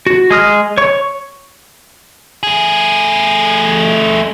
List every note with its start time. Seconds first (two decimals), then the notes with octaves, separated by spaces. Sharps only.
0.06 F#4
0.31 G#3 D#6 F6
0.78 C#5 C#6
2.43 A3 G#4